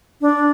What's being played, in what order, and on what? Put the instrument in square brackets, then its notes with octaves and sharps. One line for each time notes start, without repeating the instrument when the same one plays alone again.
[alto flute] D4